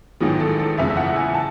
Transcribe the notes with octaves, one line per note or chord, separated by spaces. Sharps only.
A1 G#2 D#3 F#3 B3 G#4
A4
A4
F#1 E2 C#3 G#3 E5
E5
F#5
G#5
A5